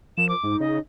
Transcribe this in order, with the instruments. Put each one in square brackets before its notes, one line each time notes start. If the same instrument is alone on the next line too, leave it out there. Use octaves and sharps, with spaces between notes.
[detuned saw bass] F3 [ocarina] A#4 [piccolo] E7
[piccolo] D6
[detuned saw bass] G#2 [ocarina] D#4
[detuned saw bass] C#3 [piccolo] D#5